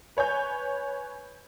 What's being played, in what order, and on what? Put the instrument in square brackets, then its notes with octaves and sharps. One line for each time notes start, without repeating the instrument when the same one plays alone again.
[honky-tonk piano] B4 C#5 G#5 G6